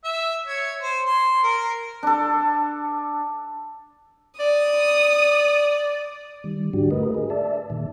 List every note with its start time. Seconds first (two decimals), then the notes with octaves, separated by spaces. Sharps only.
0.04 E5
0.47 C#5
0.83 C5
1.06 C6
1.43 A#4
2.03 D4 A4
4.40 D5 D#6
6.44 D#3 G3
6.73 G#2 D3 D4 F#4 G4
6.91 A3 A#4 B4 D#5
7.15 G#4
7.30 D5 E5 A5
7.70 A#2 D#3